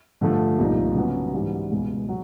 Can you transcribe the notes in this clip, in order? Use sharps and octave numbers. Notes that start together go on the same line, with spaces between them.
G2 D3 F3 A3
C2 A#2 F3 A#3 D#4
C#3 F#3 B3
G#2 E3 G3
C#2 B2 G#3
F#3